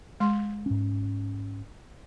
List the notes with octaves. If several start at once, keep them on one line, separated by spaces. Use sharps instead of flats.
G#3 C6
G#2 C#4